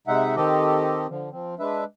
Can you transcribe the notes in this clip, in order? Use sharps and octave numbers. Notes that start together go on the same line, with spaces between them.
C3 G#3 D#4 E5 F#5
D#3 C4 G4 A4 D#5
D3 F3
F3 C4
G#3 D4 B4 E5